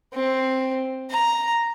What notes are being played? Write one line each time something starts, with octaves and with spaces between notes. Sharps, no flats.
C4
A#5